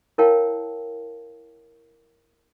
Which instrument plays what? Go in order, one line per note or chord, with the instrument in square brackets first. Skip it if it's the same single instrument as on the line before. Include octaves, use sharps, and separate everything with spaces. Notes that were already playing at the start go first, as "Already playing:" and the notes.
[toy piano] E4 A#4 C#5 F5 G5 A5